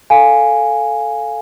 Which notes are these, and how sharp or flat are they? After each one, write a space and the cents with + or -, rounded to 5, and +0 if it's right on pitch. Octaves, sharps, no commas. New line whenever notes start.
A4 +0 F5 +0 G#5 +0